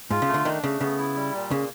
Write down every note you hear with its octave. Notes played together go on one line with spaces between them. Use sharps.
G#2 F4
C#3
A3
D3
D#3 D4
C#3 A3
C#3 B3
E4
G3
A#2
C#3 A#3